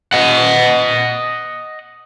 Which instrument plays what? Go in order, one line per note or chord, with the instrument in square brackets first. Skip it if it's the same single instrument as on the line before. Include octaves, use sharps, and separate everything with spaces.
[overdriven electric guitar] D#5 F#5